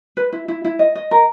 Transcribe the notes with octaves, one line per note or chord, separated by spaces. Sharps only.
B4
E4
E4
E4
D#5
D#5
A#4